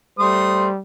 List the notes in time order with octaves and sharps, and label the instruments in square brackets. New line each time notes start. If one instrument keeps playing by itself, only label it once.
[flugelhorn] G3 [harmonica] A3 C5 D#6